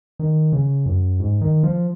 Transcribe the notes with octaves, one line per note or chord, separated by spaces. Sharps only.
D#3
C#3
F#2
G#2
D#3
F3